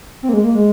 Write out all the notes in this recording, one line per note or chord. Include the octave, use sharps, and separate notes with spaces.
C4
A#3
G#3
A#3
G#3